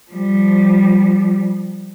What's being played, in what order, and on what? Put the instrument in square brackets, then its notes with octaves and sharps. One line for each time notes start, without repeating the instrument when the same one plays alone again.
[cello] F3 G3